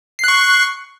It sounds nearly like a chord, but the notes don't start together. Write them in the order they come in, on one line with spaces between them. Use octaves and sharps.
C7 F#6 C#6